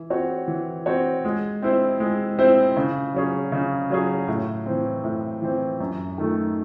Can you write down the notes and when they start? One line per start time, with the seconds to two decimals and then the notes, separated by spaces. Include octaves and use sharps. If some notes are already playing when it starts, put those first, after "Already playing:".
Already playing: E3
0.10 C4 F#4 C#5
0.48 E3
0.86 C4 F#4 C#5
1.25 G#3
1.62 C4 E4 C5
2.00 G#3
2.39 C4 E4 C5
2.77 C#3
3.13 F#3 C#4 G#4
3.52 C#3
3.90 F#3 C#4 G#4
4.28 A2
4.66 E3 C4
5.04 A2
5.42 E3 C4
5.80 F#2
6.18 D#3 A3